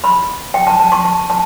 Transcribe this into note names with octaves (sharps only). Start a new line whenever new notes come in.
B5
G5
A5
A5
C#6
A5
A5